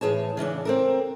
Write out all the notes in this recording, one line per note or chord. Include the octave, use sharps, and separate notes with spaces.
A2 E3 G#4 C#5 A5
C#3 E3 C#4 D4
C4 A4 A#4